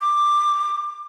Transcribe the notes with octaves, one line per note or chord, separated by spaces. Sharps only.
D6